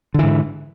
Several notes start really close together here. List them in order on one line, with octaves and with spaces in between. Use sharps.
D3 E3 G#2